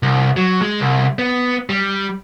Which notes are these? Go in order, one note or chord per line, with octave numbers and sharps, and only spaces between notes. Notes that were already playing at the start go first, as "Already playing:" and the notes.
C2
F#3
G#3
C2
B3
G3